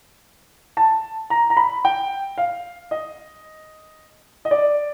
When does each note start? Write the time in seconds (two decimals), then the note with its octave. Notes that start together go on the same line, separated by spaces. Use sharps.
0.77 A5
1.30 A#5
1.50 A#5
1.57 B5
1.85 G5
2.38 F5
2.91 D#5
4.45 D#5
4.51 D5